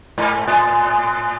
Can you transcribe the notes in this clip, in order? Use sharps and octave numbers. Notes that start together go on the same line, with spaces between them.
G#2
A2